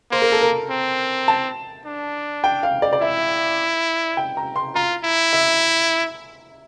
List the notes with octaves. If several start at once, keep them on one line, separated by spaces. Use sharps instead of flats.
A#3 C5
A#4
A4
A#4
C4
A5
D4
G5
F5
D5
D5
E4 E5
G5
A#5
C6
F4 A#5
E4
E5